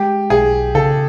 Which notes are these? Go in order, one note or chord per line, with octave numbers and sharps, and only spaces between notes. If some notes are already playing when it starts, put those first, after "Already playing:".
Already playing: G#3 G4
B1 G#4
C#3 A4